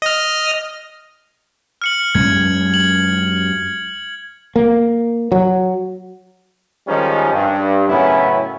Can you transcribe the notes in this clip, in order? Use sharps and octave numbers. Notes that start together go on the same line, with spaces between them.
D#5 F6
F6 C#7 F#7
F#2 G#3 C#4 G#6
F#7
A#3
F#3
D#3 F3 G3 G#3 C#4 D#4
G2
F#2 A2 C#3 B3 C#4 E4